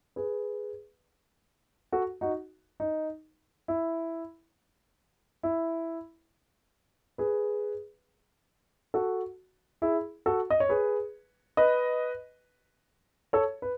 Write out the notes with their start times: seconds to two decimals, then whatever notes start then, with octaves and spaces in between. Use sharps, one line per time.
0.16 G#4 B4
1.92 F#4 A4
2.21 D#4 F#4
2.80 D#4
3.68 E4
5.43 E4
7.18 G#4 B4
8.94 F#4 A4
9.82 E4 G#4
10.26 F#4 A4
10.50 D#5
10.60 C#5
10.69 G#4 B4
11.57 B4 D#5
13.33 A4 C#5
13.62 B4